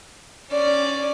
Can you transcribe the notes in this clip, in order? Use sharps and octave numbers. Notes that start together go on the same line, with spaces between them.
C#4 D5